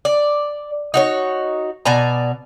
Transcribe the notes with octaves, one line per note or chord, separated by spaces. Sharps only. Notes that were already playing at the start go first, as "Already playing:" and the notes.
D5
D#4 F#4 C#5
B2 D5 G#5 A#5